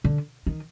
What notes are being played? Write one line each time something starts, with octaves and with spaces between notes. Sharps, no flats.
D3
D#3